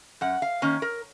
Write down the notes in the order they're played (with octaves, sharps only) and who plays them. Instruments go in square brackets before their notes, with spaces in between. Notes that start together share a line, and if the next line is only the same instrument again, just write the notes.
[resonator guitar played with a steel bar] F#2 F#5
F5
D#3 A#3 C#4
A#4